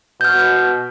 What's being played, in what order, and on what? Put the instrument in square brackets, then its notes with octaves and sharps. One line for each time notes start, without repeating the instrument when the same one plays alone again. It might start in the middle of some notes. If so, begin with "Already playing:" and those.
[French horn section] B2 [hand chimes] F6 G6